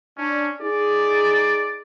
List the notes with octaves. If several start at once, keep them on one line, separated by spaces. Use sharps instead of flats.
C#4 D4
D#4 G#4 D5